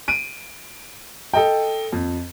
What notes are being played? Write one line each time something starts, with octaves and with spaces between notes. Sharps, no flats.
D7 D#7
A4 D#5 G5
F2